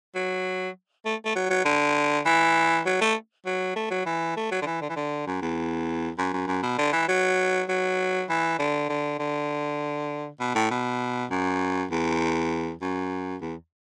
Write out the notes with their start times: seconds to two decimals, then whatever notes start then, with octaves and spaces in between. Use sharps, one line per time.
0.15 F#3
1.06 A3
1.25 A3
1.36 F#3
1.50 F#3
1.65 D3
2.26 E3
2.86 F#3
3.01 A3
3.46 F#3
3.76 A3
3.91 F#3
4.06 E3
4.37 A3
4.52 F#3
4.62 D3
4.66 E3
4.82 D3
4.90 E3
4.96 D3
5.27 F#2
5.42 E2
6.18 F#2
6.33 F#2
6.47 F#2
6.63 B2
6.78 D3
6.93 E3
7.08 F#3
7.69 F#3
8.29 E3
8.59 D3
8.89 D3
9.19 D3
10.40 B2
10.55 A2
10.71 B2
11.30 F#2
11.91 E2
12.82 F#2
13.41 E2